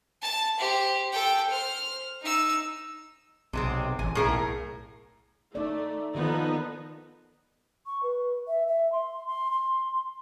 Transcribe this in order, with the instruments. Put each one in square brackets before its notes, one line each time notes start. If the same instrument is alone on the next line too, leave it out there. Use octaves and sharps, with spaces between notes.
[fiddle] A5
G4 C5
A4 G5
C5 F6
D#4 E6
[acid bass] B1 [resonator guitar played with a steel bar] C3 G#3 C4
[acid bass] A1 [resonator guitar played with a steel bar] G#5
[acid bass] B1 [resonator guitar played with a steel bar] A2 G#4 A#4
[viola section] A3 [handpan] D#4 D5
[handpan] D#3 A4 B4 [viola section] F3 B3 D#4
[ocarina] C#6
B4
E5
E5
C6
C6
C6